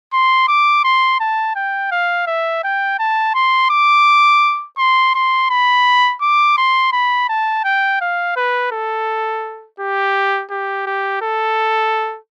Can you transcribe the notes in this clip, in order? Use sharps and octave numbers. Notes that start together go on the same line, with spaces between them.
C6
D6
C6
A5
G5
F5
E5
G5
A5
C6
D6
C6
C6
B5
D6
C6
B5
A5
G5
F5
B4
A4
G4
G4
G4
A4